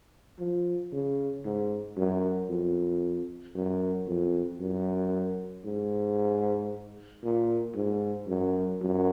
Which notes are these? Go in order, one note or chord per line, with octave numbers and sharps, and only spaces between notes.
F3
C#3
G#2
F#2
F2
F#2
F2
F#2
G#2
A#2
G#2
F#2
F#2